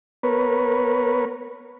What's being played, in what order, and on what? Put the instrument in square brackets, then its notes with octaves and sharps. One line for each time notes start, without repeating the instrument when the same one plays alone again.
[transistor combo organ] B3 A#4 B4 C#5